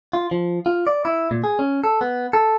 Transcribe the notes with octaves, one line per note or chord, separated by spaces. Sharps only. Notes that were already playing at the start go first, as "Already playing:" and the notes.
F4
F3
F4
D5
E4
A#2
G#4
C#4
A4
B3
A4